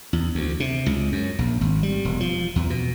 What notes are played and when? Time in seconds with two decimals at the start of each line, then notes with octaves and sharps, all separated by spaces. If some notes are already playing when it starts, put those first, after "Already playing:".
0.13 E2
0.35 D2
0.60 C3
0.86 C#2
1.12 F#2
1.39 A#1
1.61 G#1
1.83 G3
2.05 E1
2.20 F3
2.56 E2
2.70 B2